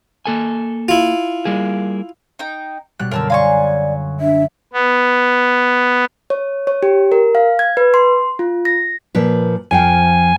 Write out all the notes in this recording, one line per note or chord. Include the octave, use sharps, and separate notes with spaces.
A#3 A4 G#5
E4 F4
G3 A#3 G#4
D#4 G5
B2 G3 F#6
F#2 D3 A#4 A5 E6
D5 F5 G#5 A#5 C6 C#6
D4 E5
B3
C#5
C#5
G4
A#4
F5
G#6
B4
C6
F4
A#6
A#2 F3 B4
F2 F3 G5 G#5